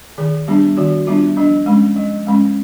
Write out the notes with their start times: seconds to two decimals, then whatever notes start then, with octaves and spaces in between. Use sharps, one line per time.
0.18 D#3 G#4
0.48 G3 B3 D4 G4
0.77 D#3 F#4
1.07 G3 B3 D4 F4
1.36 F3 D4
1.66 G#3 C#4
1.96 F3
2.27 G#3 C#4